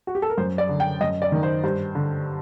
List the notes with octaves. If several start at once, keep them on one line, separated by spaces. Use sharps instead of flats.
F#4
G4
A4
A#4
F#2 C5
D5
D3
G5
F#2 D#5
D5
D#3
C5
G2 C5
D3